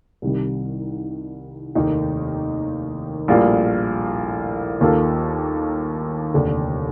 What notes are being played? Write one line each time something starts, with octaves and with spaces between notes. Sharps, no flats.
C2 C3 D#3 G3
F1 D#2 D#3 A#3 D#4
A#1 A2 G3 A#3 F4
D#2 D#3 A#3 F4 A4
F1 D#2 D3